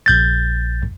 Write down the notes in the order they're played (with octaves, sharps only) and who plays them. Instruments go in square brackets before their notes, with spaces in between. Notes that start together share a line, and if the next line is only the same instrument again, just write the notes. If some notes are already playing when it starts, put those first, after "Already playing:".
[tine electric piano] A#1 G6 A6